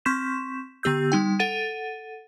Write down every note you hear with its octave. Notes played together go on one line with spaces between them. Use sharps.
C4 C6 C#6 G6 B6 E7
D3 B3 G4 E6 G6
G3 D#4 G5
A4 F#5 A6 D#7